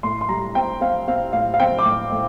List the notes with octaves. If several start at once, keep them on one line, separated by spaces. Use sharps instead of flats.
A2 C6
C6
G3 A#5
C4 G5
C4 F5
C4 F5
A2 F5
F5
C4 G5
D6
A2
A2